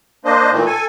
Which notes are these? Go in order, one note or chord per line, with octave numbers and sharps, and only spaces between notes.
A#3 D4 C5 D#5
A#2 D#3 E3 A3
A4 G#5